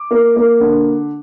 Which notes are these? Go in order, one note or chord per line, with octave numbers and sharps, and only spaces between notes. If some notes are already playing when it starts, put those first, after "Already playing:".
Already playing: D6
A#3
A#3
D3